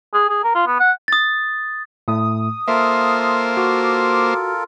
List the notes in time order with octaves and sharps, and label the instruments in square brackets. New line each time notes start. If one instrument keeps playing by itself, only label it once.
[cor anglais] G#4
G#4
A#4
F4
B3
F#5
[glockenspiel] D#6 A6
[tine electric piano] A2 A3 [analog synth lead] D#6
[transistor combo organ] A#3 C5 [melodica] F4 A4 A#4 [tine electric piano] E5
[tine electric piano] F#4 [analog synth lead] D6